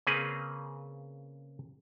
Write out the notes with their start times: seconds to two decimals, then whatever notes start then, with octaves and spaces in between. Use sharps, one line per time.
0.07 C#3 A#3 C4 C#4 G#4 B4